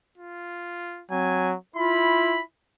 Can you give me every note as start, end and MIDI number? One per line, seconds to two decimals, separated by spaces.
0.18 1.04 65
1.11 1.56 54
1.11 1.52 60
1.11 1.51 80
1.76 2.42 64
1.76 2.38 65
1.76 2.42 83